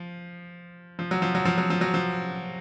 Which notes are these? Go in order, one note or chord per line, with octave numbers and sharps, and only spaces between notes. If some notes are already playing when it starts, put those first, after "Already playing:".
Already playing: F3
F3
F#3
F3
F#3
F3
F#3
F3
F#3
F3